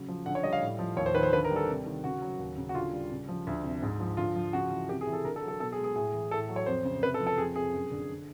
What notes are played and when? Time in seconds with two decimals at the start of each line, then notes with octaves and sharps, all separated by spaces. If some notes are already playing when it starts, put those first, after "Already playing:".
Already playing: C#3 F#3
0.09 F3
0.26 D3 F#5
0.35 C#5
0.44 G3 D#5
0.53 F5
0.62 A2
0.79 F3
0.97 D#2 C#5
1.06 C5
1.15 D#3 B4
1.23 C5
1.33 D3 B4
1.44 A#4
1.51 G3
1.56 A4
1.68 C3
1.86 D#3
2.04 C#3 F#4
2.22 F#3
2.39 D#2
2.57 C#3
2.69 F#4
2.75 D3 F4
2.92 G3
3.11 C#3
3.29 F3
3.47 D2
3.64 C3
3.82 G#2
4.00 F3
4.17 D3 F4
4.36 F3
4.53 C#3 F#4
4.71 E3
4.89 C3 G4
5.01 G#4
5.07 E3
5.13 A4
5.24 D3 A#4
5.36 A4
5.42 F#3
5.48 A4
5.60 B2 A4
5.72 G#4
5.78 G#3
5.84 G#4
5.95 A2 G#4
6.14 E3
6.31 A2 A4
6.49 F#3
6.56 C#5
6.66 F2 C5
6.85 C#3
7.03 C3 B4
7.14 A4
7.20 F3
7.27 A4
7.38 F2 G#4
7.55 C3 G#4
7.74 F#2
7.92 D3
8.09 D3